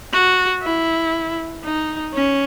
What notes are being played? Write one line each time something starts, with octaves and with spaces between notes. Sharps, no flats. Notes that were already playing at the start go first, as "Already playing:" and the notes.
F#4
E4
D#4
C#4